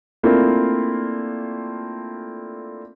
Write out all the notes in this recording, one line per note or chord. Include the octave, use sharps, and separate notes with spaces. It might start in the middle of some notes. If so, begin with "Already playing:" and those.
A3 A#3 C4 D4 E4 F4